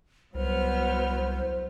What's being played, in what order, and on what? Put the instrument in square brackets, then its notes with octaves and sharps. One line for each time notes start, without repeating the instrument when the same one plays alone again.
[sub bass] C2 [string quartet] F#3 B3 F6 [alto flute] C5